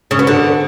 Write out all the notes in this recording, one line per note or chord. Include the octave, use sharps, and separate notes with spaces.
C#3
B3
D3